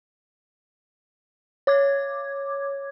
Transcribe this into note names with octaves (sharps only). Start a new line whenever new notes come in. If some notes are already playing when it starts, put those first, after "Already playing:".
C#5 D6 G#6